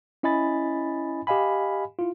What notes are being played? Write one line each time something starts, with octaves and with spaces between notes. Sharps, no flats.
C#4 E4 D#5 G#5 B5 A6
G4 D#5 F5 G#5 B5
E4 F4